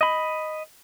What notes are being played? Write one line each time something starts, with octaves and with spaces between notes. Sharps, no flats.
D#5 B5